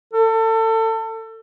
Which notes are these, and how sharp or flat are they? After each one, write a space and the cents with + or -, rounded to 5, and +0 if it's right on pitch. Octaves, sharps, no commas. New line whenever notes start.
A4 +30